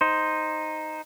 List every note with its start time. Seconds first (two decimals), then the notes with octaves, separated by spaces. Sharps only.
0.01 D#4 C5